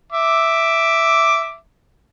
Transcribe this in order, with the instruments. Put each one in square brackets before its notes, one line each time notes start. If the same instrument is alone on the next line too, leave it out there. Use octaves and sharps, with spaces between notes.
[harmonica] E5 D6